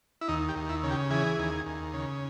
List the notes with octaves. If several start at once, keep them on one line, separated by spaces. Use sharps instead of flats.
E4
D#2 D#4
G4
D#2
E4
C#3
G4
E3 G#4
D#2
D#2
C#3